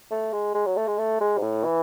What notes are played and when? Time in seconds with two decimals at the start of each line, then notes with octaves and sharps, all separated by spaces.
0.11 A3
0.33 G#3
0.54 G#3
0.66 F#3
0.77 A3
0.88 G#3
0.98 A3
1.21 G#3
1.37 G#2
1.42 A2
1.64 E3